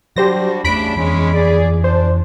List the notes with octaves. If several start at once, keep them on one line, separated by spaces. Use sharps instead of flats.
F#3 G3 D4 F#4 G4 C5 A#6
E2 A2 C#3 A3 D4 B5 B6 D7
F2 E3 G#3 C#4
G#4 D5
D4 C5